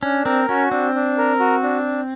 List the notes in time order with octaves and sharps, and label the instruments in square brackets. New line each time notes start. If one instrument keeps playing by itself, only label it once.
[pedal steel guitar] C#4 [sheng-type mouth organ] D4
[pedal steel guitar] C4 [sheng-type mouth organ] A#4
[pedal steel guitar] C#4 [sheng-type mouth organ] F#4
[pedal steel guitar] C4 [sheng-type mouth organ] D4
[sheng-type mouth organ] D4
A#4
F#4
D4